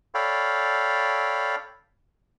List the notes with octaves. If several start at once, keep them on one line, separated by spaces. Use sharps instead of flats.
A4 C#5 D5 F5 G5 B5